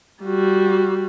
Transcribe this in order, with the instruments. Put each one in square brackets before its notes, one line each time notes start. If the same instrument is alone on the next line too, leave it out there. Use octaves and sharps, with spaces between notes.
[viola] G3 F#4